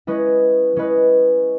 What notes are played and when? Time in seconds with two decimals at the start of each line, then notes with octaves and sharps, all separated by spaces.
0.07 G#3 C#4 E4 B4 D#5
0.76 G#3 C#4 E4 B4 D#5